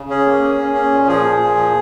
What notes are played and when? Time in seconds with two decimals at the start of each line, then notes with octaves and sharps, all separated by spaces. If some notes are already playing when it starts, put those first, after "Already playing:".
Already playing: C#3
0.10 C#4 G#4
0.26 A#3
0.42 A#3
0.59 C#4
0.75 C#4
0.91 A#2
1.08 F3 G#4
1.25 A#2
1.40 A#2
1.57 F3